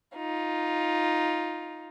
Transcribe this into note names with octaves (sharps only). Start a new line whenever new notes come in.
D#4 F4